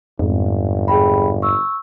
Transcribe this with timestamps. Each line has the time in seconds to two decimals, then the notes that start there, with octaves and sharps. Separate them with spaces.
0.19 G1 F2 G#2
0.88 G#4 G5 B5
1.42 C#6 E6